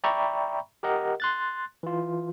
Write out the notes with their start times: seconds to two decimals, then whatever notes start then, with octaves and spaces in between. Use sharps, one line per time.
0.04 D5 E5 G5 A#5 B5 C#6
0.83 G4 A#4 D#5 F#5
1.20 C6 F#6 A6
1.83 E3 F4